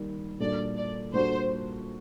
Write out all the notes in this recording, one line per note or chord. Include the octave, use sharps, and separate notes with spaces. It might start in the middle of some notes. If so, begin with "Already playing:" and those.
Already playing: D#3 G3 A#3
A#2 G3 D4 F#4 A4 D5
D5
A#2 G3 D4 F#4 A4 C5